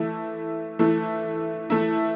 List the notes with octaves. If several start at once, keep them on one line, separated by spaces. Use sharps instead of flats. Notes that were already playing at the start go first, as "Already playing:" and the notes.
Already playing: E3 A3 E4
E3 A3 E4
E3 A3 E4